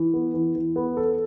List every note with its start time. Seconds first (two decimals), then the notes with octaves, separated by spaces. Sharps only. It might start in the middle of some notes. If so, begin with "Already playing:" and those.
Already playing: E3
0.14 B3
0.34 E3
0.55 E3
0.76 B3
0.97 A4